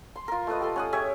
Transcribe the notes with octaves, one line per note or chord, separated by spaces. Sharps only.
C6
F4 A#4
A3 F4 B4 D#5
G4 A4 C6
C#4 F#5 D#6
G4 G#4 C#5 E5